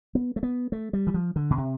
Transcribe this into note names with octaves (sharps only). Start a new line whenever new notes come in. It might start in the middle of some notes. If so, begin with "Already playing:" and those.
B3
A3
B3
A3
G3
E3
F3
D3
B2
C3